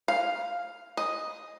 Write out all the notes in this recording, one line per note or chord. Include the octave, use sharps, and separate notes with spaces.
F5
D#5